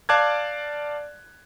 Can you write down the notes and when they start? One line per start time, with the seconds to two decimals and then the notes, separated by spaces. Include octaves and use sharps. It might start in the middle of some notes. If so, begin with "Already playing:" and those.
0.09 D5 F5 A5 D6 F#6 G#6